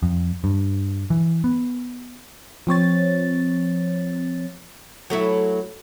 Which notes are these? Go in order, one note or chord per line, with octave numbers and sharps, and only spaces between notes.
F2
G2
E3
B3
F3 C4 C#5 A6
F#3 A3 E4